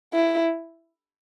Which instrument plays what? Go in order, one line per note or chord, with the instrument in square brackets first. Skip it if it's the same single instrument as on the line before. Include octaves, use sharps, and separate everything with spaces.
[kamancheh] E4